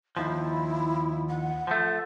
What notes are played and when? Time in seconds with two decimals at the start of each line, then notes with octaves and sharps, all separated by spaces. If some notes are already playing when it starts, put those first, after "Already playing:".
0.17 D#2 F3 E4
1.29 F#5
1.67 F3 A3